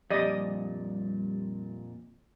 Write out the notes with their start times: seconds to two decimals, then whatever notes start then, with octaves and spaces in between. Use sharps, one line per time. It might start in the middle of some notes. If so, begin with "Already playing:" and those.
0.10 F2 A#2 G3 D5 D#5 D#6